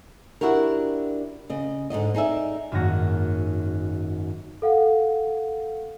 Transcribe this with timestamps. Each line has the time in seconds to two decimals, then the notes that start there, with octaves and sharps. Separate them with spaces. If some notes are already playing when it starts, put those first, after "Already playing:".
0.41 D4 E4 F#4 G4 A#4
1.50 C#3 D#5
1.90 G#2 D3 D#3 D#5
2.14 D#4 G#4 D5 E5
2.71 G#1 F#2 D#3 A#3 F#4 A#6
4.62 A4 F5 F#5